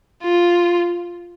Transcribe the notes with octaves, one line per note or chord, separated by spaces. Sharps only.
F4